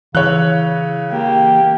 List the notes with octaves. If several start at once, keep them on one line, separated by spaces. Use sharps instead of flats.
C#3 E3 C#5 F#6
A#3 G4